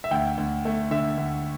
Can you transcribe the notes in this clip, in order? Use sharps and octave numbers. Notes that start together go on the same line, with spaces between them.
E5
D2 G5
D2
A3
D3 E5
D2